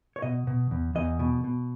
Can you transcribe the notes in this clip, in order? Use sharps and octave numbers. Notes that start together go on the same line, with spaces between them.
C#5
B2 D#5
B2
E2
E2 D#5
B2
B2